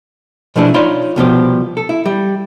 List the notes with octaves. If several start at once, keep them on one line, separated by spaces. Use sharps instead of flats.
B2 F3 A3 D4 E4 G#4
D#4 F4 C#5 D5 B5 C6
C2 B2 F3 G4
A4
E4
G3